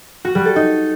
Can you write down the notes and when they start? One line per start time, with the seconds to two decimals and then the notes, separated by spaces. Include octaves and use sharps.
0.25 F#4
0.35 G3
0.45 A4
0.56 D#4